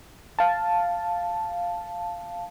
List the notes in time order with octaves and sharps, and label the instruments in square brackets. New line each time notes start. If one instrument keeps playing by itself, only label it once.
[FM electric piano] F5 A5